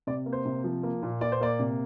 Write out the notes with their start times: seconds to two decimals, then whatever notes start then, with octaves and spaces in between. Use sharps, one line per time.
0.07 C3 D5
0.26 A#3
0.33 C5
0.46 C3
0.64 F3
0.83 A#3
1.03 A#2
1.21 A#2 D5
1.32 C5
1.41 A#3 D5
1.59 C3